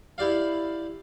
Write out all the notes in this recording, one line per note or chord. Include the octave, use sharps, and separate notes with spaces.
E4 G4 D5 F5